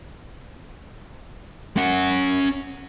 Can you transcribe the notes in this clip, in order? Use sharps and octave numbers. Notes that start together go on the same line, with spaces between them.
C#4 F#5